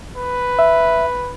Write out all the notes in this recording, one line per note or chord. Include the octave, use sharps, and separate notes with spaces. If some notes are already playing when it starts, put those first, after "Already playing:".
B4
E5